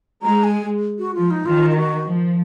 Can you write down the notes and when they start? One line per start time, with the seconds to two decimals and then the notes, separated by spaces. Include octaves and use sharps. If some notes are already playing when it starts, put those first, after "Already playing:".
0.23 G#3 A#5
0.44 G#5
0.99 F#4
1.14 F3 F4
1.31 D#4
1.45 D#3 F4
1.70 F4
1.76 F#4
2.06 F3